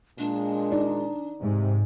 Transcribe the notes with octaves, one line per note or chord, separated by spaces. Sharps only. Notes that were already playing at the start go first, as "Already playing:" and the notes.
A#2 G#3 D4
D#4 D5
G#2 C3